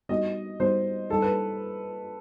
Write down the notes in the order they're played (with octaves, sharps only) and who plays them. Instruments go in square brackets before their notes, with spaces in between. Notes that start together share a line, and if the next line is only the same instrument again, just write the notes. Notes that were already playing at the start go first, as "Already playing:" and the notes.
[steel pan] G3 B3 D#4 F#4 [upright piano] D#5
[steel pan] G3 B3 D#4 F#4 [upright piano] C5
[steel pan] G3 D#4 G4 [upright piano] A4
[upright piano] B4